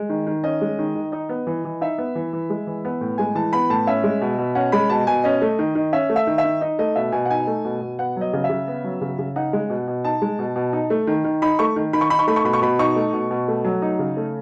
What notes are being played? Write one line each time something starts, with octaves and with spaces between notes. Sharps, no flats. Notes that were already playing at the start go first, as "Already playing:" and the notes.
Already playing: G#3
D#3
D#3
C#4 D#5
G#3
D#3
D#3
D#4 D#5
B3
E3
E3
D#4 E5
B3
E3
E3
G#3
E3
B3
A2
G#3 G#5
E3 A5
B3 B5
A2 A5
C#4 E5
G#3
B2
B2
C#4 F#5
G#3 B5
B2 A5
B2 G#5
C#4 D#5
A3
D#3
D#3
C#4 E5
A3
E5
D#3
E5
D#3
D#4 D#5
A3 D#5
B2 E5
B2 G#5
F#5
D#4 G#5
A3
B2
B2
B3 F#5
F#3 D#5
C#3
E5
C#3
B3
F#3
C#3
C#3
D#4 F#5
G#3
B2
B2
D#4 A5
G#3
B2
B2
D#4
A3
D#3
D#3
D#4 B5
A3 C#6
D#3
D#3 B5
C#6
D#4 B5
C#6
A3 B5
C#6
B2 B5
C#6
B2 B5
D#4 C#6
A3
B2
B2
A3
F#3
D#4
C#3
A3